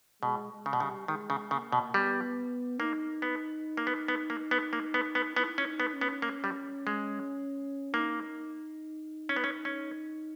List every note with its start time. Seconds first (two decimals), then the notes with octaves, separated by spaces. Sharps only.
0.22 B2 G#3
0.52 G#3
0.66 C#3
0.73 B2
0.80 C#3 G3
1.08 D#3 G#3
1.30 C#3
1.51 C#3 A#3
1.72 B2
1.94 G3 B3
2.79 A#3 D#4
3.22 B3
3.77 A#3
3.87 B3
4.08 B3
4.30 A#3
4.51 B3
4.73 A#3
4.94 B3
5.15 B3
5.36 B3 E4
5.58 C#4
5.65 D#4
5.80 B3
5.94 C#4
6.01 B3
6.22 A#3
6.44 G3
6.87 G#3
7.94 A#3 D#4
9.29 C#4
9.36 B3
9.44 C#4
9.65 C#4